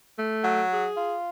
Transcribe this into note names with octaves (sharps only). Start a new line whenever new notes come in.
A3
F#3
G#4
F4